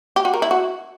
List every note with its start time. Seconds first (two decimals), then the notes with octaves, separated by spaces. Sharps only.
0.16 G4
0.25 F#4
0.34 A#4
0.42 E4
0.51 F#4